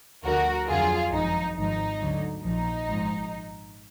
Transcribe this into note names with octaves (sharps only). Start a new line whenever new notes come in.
D2 D3 F3 F#4 A#4
F2 D3 F#3 F4 G#4
G#1 F#2 F3 D#4
G#1 G#2 F3 D#4
D2 D3 F#3
A#1 A#2 F3 D#4
G#1 G#2 F3